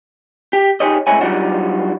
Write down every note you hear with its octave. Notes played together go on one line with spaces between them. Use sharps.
G4
D#4 G4 G#4 C#5 D#5
C2 A2 G#3 E4 C#5 G#5
F#3 G3 D4 D#4 F4 F#4